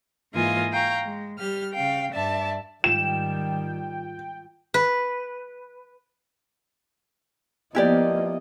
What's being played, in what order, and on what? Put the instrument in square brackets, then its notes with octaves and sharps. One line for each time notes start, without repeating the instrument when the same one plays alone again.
[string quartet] G#2 E3 A#3 F4 D#5 G#5
F5 G5 A#5 C#6
G#3
G3 G4 F6
C#3 F5 G5
G2 D5 E5 A5
[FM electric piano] G#2 F4 [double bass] D#3 G3 [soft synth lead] G5 [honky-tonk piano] E7
[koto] B4
[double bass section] F3 A#3 B3 [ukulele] E4 G4 D5 [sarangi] D#5